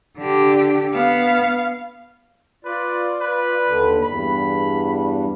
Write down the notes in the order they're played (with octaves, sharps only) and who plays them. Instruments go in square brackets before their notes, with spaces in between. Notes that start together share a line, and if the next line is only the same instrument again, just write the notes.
[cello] D3 G4
[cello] B3 [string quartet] F5
[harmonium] F4 D5 [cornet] B4
[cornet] B4
[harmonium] D#2 D3
[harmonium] E2 G2 [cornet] B5